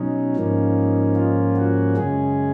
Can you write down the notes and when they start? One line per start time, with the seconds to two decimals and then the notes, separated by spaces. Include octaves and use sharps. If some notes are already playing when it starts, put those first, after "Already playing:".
Already playing: B2 F#3 C#4 D#4
0.36 G#2 F3 A#3 C#4
1.16 F4
1.56 F#4
1.96 F#2 C#3 G#3 C#4 G#4